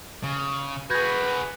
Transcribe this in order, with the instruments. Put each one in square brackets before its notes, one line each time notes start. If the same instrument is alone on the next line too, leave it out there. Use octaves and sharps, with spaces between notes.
[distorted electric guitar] C#3
[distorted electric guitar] F#4 G#4 [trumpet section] B4 [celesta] G6 G#6 A#6